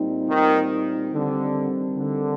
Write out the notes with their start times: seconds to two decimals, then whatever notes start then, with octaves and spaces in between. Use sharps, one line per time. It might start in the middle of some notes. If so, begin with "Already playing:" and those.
Already playing: A#2 G3 C4 D#4
0.29 D#3
1.12 D3 D#3 G3 C4
1.96 D3